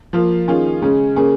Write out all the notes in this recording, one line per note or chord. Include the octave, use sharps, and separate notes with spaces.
F3 A#3 F4
D#3 C#4 F4 G#4
C#3 G#3 C#4 G#4
C#3 A#3 C#4 G#4